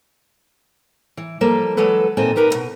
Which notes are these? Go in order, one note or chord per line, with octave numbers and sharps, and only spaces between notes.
E3
F3 G3 A#3 A4
E3 F#3 G#3 A4 B4
D#2 A#2 C4 A4 D#5 G#5
D#4 G4 A#4 B4
D#2 B2